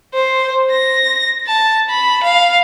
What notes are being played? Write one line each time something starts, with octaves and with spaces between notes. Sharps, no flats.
C5
A#6
A5
B5
F5